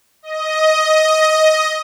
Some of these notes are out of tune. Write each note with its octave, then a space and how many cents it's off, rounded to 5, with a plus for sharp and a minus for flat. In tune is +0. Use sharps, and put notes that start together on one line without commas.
D#5 +10